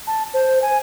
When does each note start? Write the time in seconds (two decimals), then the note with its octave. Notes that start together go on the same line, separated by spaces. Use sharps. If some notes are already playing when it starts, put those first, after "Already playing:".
0.07 A5
0.34 C5
0.62 G#5